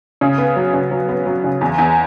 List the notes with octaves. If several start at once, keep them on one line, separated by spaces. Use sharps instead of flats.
C#3
B3
F#3
C#3
F#3
B3
F#3
C#3
E2
E2